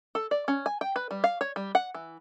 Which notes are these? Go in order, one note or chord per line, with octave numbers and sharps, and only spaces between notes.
A4
D5
C#4
G#5
G5
B4
G3
F5
C#5
G3
F#5
E3